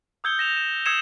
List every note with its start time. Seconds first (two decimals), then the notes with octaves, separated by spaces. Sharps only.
0.24 D#6 E6 G6 G#6 C#7 G7
0.39 A#6 E7 F7
0.57 E7
0.86 D#6 E6 G#6 C7 C#7 E7